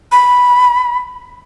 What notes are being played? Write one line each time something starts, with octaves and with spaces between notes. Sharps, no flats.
B5